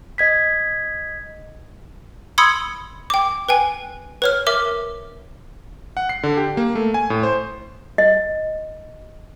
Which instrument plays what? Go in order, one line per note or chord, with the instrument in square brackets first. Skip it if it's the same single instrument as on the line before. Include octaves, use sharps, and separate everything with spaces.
[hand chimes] D#5 G#6 B6
[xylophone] B5 C6 D#6 E6 G#6 C#7
G5 D6
B4 G5 G#5
B4 C#5 F6
A#4 E5 D6 F6
[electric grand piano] F#5
C7
D3
G4
A#3
A3
G#5
A2
C5
[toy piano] D#5